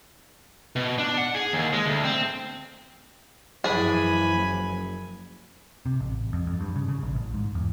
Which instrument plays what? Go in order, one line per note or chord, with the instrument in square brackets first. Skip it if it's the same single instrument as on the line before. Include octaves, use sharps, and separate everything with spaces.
[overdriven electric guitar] B2
D4
F#5
G#4
D#2
G#3
D2
C4
[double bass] F#2 F3 [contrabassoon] E3 [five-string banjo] D4 G#4 [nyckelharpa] G#5 B5
[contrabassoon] F#1
[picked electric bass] C3
A1
F2
F2
G2
C#3
C#3
A#1
A1
G#2
E2